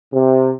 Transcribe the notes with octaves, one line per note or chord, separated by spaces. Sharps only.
C3